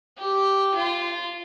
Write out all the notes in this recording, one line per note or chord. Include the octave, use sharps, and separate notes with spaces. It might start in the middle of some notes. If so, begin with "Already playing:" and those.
G4
F4